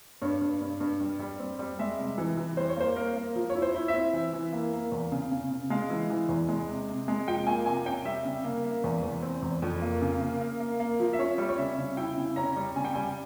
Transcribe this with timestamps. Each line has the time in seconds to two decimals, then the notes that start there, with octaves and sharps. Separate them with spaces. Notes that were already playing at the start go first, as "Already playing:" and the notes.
0.22 G2 C#5
0.41 G2
0.61 G2
0.80 G2
1.01 G3
1.19 G3
1.39 C4
1.59 G3
1.79 G#3 E5
1.99 C3
2.18 E3
2.37 E3
2.57 G3 C5
2.69 C#5
2.76 A#3 C5
2.96 A#3 A#4
3.16 A#3
3.36 F3
3.50 C#5
3.55 E4
3.62 C5
3.74 E4
3.88 E5
3.94 C4
4.14 E3
4.33 E3
4.53 A#3
4.73 A#3
4.92 E2
5.12 C#3
5.31 C#3
5.50 C#3
5.70 G#3 F5
5.90 E3
6.10 E3
6.29 E2
6.48 G#3
6.68 C3
6.88 C3
7.08 G#3
7.27 F3 G5
7.47 A#3 G#5
7.66 C3 G#5
7.86 C#4 G5
8.05 G3 E5
8.25 C#3
8.44 A#3
8.64 A#3
8.84 E2
9.03 E2
9.22 C4
9.42 E2
9.62 F2
9.82 A#3
10.02 C#3
10.21 A#3
10.41 A#3
10.60 A#3
10.80 A#3
11.00 F3
11.13 E5
11.19 C#4 C#5
11.38 G3
11.49 C#5
11.58 C#3 E5
11.78 C#3
11.97 E4 G5
12.17 C#3
12.36 C#4 A#5
12.56 G3
12.76 C#3 G#5
12.85 G5
12.94 G3 G#5